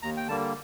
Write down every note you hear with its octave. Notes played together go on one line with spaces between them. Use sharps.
D#2 A#5
G5
D3 G3 A#3 A5